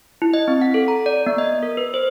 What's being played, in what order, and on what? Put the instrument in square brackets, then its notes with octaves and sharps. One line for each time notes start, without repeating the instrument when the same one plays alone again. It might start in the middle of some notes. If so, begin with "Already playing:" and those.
[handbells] E4
D#5
C4
F#5
A4
A#5
D5
B3
D#5
A#4
B4
C5